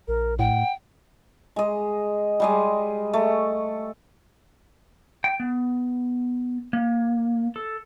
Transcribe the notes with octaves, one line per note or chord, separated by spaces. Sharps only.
A#1 A#4
A2 F#5 G5
G#3 D#5
G3 G#3 D#5
A3
G5
B3
A#3
A4